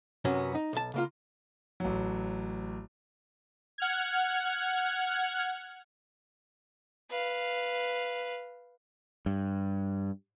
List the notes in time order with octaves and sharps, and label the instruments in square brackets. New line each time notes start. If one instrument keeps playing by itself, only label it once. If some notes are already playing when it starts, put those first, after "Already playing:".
[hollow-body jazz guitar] F#2 C3 F#3 B3 C#4
D#4
B1 A5
C#3 A#3 F4
[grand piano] A1 F#3
[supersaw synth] F#5 F6 G#6
[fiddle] B4 F5
[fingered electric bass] G2